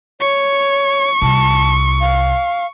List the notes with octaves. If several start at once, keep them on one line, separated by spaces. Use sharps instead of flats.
C#5 C#6
C2 A5
F5